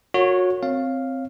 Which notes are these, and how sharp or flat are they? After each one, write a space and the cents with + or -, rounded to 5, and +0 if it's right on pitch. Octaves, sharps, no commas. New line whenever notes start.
F#4 -30 A#4 -25 C#5 -5
C4 +0 C#5 -10 F5 +0